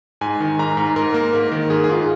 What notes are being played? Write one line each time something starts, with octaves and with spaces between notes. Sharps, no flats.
G#2 G#5
D#3
G#2 A#5
G#2
G#2 A#4
A#3
G#2 A#4
D#3
G#2 G#4
G#4
G#2 F4